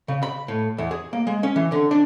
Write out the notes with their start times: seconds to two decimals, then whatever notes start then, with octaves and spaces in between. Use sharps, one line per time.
0.08 C#3
0.23 B5
0.48 A2
0.78 E2
0.91 G#4
1.13 A#3
1.27 G#3
1.43 C#4
1.56 E3
1.72 D3
1.91 D4